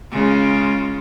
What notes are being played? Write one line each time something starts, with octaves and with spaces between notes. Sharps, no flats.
C#3 G#3 F4